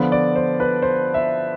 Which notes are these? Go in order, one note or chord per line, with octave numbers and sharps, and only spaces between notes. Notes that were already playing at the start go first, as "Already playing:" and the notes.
Already playing: D3 F3 B3
D5
C5
B4
C5
E5